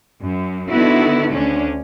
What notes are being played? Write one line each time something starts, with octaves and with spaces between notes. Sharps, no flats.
F#2
D3 D#3 B3 E4 F#4 A4
D2 C#4 D4